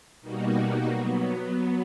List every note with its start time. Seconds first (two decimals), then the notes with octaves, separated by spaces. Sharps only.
0.21 B2 G3 A#3 D#4 F#4
0.84 F#3 B3